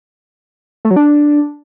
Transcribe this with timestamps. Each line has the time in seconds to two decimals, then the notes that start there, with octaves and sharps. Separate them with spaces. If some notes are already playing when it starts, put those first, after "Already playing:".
0.85 A3
0.91 F#3
0.96 D4